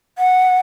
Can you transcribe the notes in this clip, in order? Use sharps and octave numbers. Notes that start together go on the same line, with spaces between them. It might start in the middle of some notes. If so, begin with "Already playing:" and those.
F#5